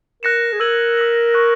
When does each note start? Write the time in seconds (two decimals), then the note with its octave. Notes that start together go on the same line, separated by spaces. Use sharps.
0.22 A#4 F#6 A#6 C#7 E7
0.52 G#4
0.60 A#4 E6 G#6 D#7 F#7
0.97 E6 B6 F#7
1.34 C#6 F#6 A#6